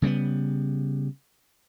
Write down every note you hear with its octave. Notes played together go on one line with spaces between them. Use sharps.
C#3 G3 G#3 B3